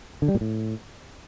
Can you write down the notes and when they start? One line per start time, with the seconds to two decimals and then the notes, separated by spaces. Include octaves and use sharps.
0.22 D3
0.28 G3
0.35 A#2
0.41 A2